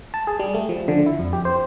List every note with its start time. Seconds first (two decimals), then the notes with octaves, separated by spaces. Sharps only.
0.14 A5
0.27 G#4
0.39 G3
0.54 A3
0.69 F3
0.88 D3
1.06 E4
1.19 F2
1.33 G4
1.45 C5